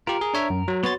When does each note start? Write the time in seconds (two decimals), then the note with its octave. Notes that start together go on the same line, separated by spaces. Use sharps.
0.07 F4 G4 A#4
0.21 G#4
0.34 D4 C#5 E5
0.50 F#2
0.68 F#3
0.83 B3 F#4 C#5 C6 A6